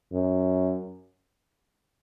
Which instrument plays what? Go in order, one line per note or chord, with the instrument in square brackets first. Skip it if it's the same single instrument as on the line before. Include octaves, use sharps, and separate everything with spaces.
[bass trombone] F#2